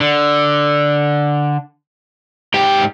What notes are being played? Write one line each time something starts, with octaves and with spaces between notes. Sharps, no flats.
D3
G#2 G4 G5